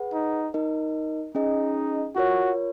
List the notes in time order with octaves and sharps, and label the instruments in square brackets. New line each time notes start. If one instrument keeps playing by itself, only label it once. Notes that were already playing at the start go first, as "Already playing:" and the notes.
Already playing: [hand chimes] G#4 B4 F#5
[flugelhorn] D#4
[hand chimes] D#4 A#4 D#5
[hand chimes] C#4 G#4 D#5 [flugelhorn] D#4
[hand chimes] F4 A#4 C#5 [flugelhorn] F#4